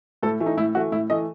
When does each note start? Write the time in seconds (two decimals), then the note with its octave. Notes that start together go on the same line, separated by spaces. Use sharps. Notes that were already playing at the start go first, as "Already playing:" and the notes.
0.23 A2 A4
0.40 E3 A3
0.46 D#4
0.57 A2 E4
0.75 E3 A3 F#4
0.92 A2 E4
1.10 E3 A3 D#5